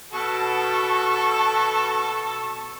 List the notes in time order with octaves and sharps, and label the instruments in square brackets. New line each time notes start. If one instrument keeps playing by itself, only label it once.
[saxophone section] B2 [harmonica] A4 [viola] A5 C#6